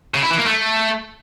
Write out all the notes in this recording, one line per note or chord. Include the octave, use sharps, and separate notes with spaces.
C#3
E4
E3
A#3
A3